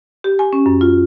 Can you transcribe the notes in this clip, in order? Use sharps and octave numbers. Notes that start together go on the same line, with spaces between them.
G4
G#5
C#4
F#2
F4